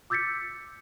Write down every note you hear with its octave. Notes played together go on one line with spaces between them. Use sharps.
D6 E6 G6 A6 B6 C#7